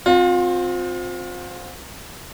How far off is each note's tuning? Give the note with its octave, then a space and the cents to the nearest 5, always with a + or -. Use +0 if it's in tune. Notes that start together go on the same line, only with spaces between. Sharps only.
C4 +0 F4 +35 C5 +0